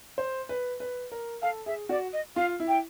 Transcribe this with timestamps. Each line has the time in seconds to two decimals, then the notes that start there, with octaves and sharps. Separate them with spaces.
0.18 C5
0.49 B4
0.80 B4
1.12 A#4
1.42 A4 F5
1.66 G#4 E5
1.89 F#4 D5
2.13 D#5
2.36 F4 F5
2.60 E4
2.68 G5